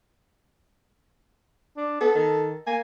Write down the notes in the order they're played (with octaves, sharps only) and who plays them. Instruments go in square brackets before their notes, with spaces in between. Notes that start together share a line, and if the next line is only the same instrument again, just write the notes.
[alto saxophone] D4
[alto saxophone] B3 [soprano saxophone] A4
[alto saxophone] D#3
[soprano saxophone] A#3 [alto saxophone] G#5